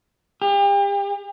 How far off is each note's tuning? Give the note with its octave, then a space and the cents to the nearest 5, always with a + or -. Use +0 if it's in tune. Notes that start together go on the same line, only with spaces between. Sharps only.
G4 +40